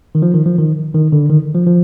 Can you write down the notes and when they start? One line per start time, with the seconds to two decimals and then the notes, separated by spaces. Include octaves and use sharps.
0.15 D#3
0.22 F3
0.34 D#3
0.46 F3
0.58 D#3
0.94 D#3
1.12 D3
1.30 D#3
1.54 F3
1.67 F3